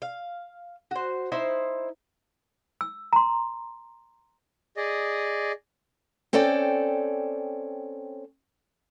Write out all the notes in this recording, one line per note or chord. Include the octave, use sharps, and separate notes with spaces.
F5
F#4 C5
D#4 E4 C5
E6
A#5 C6
G#4 D5 D#5
C4 C#4 A4 D5 G5